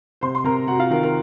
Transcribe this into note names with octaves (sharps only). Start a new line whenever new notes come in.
C3 C5 C6
C6
C3 A#4 A#5
C3 F#4 F#5
F4 F5
D#3 A#4
A#4